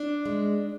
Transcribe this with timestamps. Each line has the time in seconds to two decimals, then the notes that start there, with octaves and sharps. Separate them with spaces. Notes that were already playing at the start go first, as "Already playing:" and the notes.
Already playing: D4
0.26 G#3